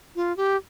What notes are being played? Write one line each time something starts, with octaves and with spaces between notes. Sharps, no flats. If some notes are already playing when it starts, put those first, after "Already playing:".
F4
G4